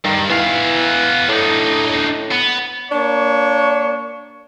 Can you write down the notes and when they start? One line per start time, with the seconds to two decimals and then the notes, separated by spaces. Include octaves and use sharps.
0.05 G2 D#3
0.30 E3 B3 F5
1.28 A2 D4 D#4
1.89 A2
2.31 B3
2.90 A#3 D4 C#5